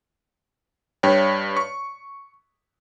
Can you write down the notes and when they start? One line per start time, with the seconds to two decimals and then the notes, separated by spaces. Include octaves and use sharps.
1.03 G2 C#5 G5
1.57 C#6